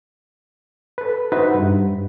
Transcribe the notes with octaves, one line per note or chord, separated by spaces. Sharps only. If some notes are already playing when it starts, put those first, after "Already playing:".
A4 B4
D#4 F#4 B4 C5 E5 F#5
G2